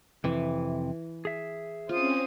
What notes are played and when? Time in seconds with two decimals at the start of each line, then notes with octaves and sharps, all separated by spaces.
0.24 F2 C3 E3
1.25 G#4 E5
1.89 C4 C#4 F4 C5 D#6